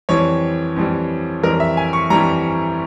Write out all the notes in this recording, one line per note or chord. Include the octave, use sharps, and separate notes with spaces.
F2 E3 G3 C#5
F2 E3 G3
F2 E3 G3 A#4
E5
G#5
C#6
F2 E3 G3 A#5